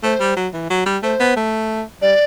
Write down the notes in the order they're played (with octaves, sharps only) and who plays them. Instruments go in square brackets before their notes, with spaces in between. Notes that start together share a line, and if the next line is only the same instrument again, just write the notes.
[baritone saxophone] A3 [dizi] C5
[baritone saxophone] G3
F#3
E3
F#3
G3
[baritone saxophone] A3 [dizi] C5
[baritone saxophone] B3
A3
[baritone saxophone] G3 [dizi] D5